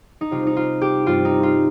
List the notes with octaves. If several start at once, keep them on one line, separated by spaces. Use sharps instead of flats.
D#4
C3 G3 C4 F4
D#4
F4
G4
G2 G3 C4 F4
D#4
F4